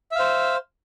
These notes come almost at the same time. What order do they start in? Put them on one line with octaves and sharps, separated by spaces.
E5 F5 C5